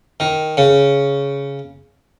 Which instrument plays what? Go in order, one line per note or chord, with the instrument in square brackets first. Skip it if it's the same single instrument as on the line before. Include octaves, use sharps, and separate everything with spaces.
[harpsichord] D#3
C#3